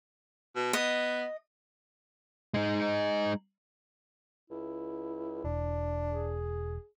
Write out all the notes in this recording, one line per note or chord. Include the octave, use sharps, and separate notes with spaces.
B2
B3 D#5
G#3 D#4
C#2 E4
E1 D4
G#4